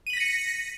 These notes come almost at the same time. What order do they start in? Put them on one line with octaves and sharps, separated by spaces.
D#7 F#7 B6 A#6 C#7